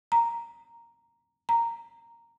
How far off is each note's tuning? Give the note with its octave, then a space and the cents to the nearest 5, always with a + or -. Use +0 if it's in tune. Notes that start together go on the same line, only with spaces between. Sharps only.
A#5 +0
A#5 -5